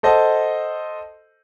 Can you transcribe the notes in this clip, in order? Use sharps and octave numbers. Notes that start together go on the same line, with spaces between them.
A4 C5 D#5 F#5 A5